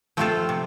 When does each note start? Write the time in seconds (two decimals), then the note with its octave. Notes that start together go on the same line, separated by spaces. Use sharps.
0.17 F3 A3 C4 F4 A4
0.49 C3